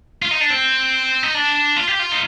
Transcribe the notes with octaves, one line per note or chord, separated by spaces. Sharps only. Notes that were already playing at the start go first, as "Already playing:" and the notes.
F4
D#4
D4
C4
D#4
D4
F4
G4
F4
D#4